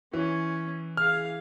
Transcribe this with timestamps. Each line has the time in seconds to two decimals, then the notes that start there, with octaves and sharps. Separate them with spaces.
0.13 E3 C#4
0.97 G#4 F5 F6